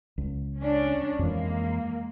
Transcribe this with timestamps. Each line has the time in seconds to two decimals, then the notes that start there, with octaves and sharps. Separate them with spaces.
0.18 C#2
0.57 C#4 D4
1.19 F2 E3 G#3 A#3